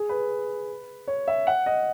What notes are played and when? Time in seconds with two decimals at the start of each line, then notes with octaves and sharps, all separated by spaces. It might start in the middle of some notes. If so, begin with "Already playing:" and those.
Already playing: G#4
0.09 B4
1.07 C#5
1.28 E5
1.47 F#5
1.66 D#5